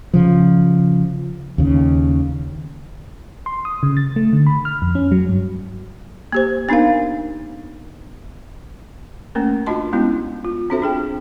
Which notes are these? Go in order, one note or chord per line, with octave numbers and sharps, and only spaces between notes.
C#3 F3
D#2 C#3
C6
D#6
C#3
A6
A3
D3
B5
F6
F2
C#4
F#3
G2
A#3 G4 C5
B3 D4 D#4 A#4 F5
A3 A#3 C#4 A#4
D4 F4 F#4 D#5 A5 C6
G#3 B3 C#4 E4 F#4
F4
C4 D4 F#4 A4 C5 E5
D4 G#4 G5